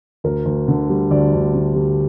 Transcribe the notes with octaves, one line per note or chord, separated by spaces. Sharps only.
D2 A#4
D2
D3
G3
D2 D5
D2
D3
G3